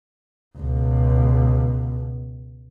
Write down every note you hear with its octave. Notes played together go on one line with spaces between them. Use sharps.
C#2 B2